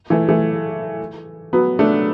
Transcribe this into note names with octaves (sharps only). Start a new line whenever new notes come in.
E3 A3
E3 A3
F#3 B3
A3 D4